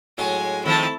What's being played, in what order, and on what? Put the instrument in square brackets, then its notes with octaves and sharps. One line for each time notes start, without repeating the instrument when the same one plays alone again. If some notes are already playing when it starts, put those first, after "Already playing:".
[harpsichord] A2 F#3 A5 [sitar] G#3 [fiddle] G#5
[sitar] D#3 F3 [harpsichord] A3 C4 [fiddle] E4 A5